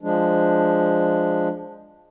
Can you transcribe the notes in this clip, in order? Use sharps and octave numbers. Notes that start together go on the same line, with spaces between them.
F3 G#3 D4